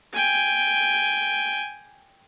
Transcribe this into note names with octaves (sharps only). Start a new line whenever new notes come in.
G5 G#5